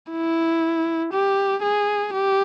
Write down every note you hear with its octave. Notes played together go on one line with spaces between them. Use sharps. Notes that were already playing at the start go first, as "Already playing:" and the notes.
E4
G4
G#4
G4